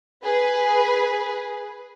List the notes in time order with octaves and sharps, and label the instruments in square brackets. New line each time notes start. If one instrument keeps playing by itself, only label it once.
[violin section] G#4 B4